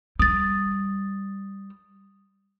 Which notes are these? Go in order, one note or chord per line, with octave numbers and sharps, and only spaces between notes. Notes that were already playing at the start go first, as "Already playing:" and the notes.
G3 D#6 A6